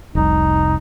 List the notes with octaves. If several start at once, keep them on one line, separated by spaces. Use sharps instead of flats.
F1 C2 D#4